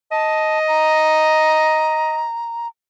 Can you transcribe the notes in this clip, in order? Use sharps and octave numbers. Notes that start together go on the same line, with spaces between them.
D#5 A5
A#5